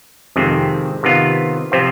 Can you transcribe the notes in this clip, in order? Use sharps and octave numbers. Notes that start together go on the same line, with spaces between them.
F2 C3 D#3 G#3 C4
C3 D#3 B3 F4
C3 F3 C4 F4